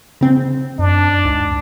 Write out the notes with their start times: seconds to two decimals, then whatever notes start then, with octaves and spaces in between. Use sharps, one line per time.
0.21 C#3 C4
0.79 F#2 D4
1.25 D2 G#2